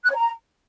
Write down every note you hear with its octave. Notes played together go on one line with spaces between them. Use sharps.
F#6
C#5
A#5